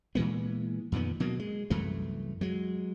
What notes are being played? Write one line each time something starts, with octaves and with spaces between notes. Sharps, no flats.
A#2 E3 G#3 B3
F2 A#2 D#3 B3
B2 F#3 A#3
G#3
C2 F#2 E3 A3
F#3 G#3